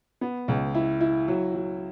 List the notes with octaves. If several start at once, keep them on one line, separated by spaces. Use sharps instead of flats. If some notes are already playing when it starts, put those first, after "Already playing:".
B3
C#2
E4
E4
F#3
F#3